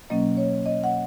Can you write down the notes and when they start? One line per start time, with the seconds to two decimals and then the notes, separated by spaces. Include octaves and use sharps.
0.10 B2 F#3 A#3 C#4 D#5
0.37 C#5
0.66 D#5
0.84 F#5